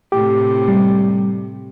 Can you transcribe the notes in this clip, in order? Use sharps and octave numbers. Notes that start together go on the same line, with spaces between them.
A2 C3 G4
G3